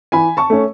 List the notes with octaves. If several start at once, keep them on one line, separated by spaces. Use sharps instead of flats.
E3 G#5 B5
A5 C#6
A3 C#4